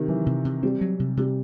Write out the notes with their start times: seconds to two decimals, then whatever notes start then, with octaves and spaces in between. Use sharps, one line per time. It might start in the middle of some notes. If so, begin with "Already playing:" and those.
Already playing: C3 D#3
0.08 E3 F#3
0.26 C3
0.45 C3
0.63 G3 C4
0.81 F#3
1.00 C3
1.17 C3 G3